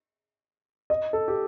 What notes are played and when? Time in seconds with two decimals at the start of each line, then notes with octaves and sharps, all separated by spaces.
0.90 D#5
1.13 A4
1.28 G4